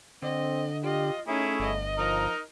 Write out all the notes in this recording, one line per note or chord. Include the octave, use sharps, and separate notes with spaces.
D3 C4 D#5
F4 G4 D#5
A3 C#4 D#4 E4 G#4 C#5
G1 D#5
F3 D#4 A#4